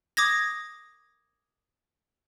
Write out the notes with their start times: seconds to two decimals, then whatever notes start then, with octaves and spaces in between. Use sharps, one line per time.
0.17 D6 D#6 G#6 A#6